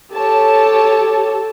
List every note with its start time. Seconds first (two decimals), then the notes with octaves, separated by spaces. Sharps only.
0.13 G4 A4 C#5 A5